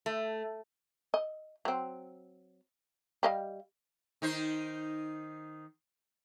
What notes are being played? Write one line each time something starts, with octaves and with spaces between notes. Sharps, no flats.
A3
D#5
F#3 C4
G3 D#5 F5
D#3 D#4 C5